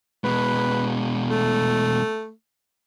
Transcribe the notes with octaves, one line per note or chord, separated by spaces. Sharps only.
B2 G#3 B4
A3